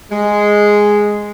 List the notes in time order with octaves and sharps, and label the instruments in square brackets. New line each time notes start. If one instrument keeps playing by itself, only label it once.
[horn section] G#3